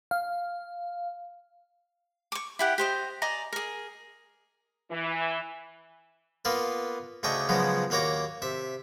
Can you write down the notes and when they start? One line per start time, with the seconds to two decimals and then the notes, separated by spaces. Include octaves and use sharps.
0.11 F5
2.32 C#6 D6
2.59 E4 G4 F#5
2.78 G4 C5 D#5
3.22 D5 D#5 G#5 A#5
3.53 G#4 A#4
4.91 E3
6.45 A#3 B3 F4 B4
7.23 D2 C#3 D4 D#5 G5 C#6
7.49 C#3 F3 F#3 G#3 B3 F#4
7.90 D#2 A#3 F#4 C#5 A#5 D6
8.42 C3 E5